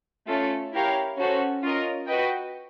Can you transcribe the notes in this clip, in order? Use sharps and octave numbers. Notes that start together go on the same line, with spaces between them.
A3 C#4 F4 A4
E4 G4 A#4 C#5 F5
C#4 F#4 A4 C5
C#4 F4 A#4 D#5
F#4 B4 D#5 G5